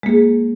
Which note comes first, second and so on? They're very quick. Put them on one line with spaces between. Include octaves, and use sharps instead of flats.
G#3 A#3 G#4